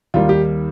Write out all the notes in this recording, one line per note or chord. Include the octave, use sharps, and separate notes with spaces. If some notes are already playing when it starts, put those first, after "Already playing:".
D#2 D#3 G3 A#3 F4
G4